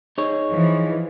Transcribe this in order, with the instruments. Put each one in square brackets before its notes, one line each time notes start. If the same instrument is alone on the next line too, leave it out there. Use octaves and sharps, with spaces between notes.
[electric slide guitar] D#4 G#4 C#5
[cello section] E3 F3